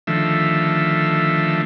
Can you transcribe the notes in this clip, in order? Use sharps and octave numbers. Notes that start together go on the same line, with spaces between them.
D3 D#3 F3 A3 E5